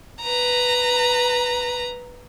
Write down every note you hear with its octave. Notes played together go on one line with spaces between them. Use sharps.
B4 A#5